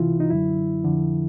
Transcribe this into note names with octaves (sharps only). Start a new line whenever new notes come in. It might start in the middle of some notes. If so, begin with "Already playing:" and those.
Already playing: C#2 C3 E3 E4 F4
D#4
F#2 D3 F#3 E4
F2 D3 F3